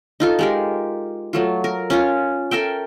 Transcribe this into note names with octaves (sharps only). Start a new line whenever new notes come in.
D#4 F4 A4
G#3 G4 A#4
F#3 A3 F4
A#4
C#4 F4 C#5
A4 A#4 E5 G5